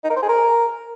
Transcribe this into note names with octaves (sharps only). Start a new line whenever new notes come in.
D#4
A#4
C5
G#4
A#4